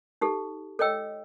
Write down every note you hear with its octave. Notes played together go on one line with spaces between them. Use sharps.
D#4 G4 A4
A4 C#5 D#5 G5 E6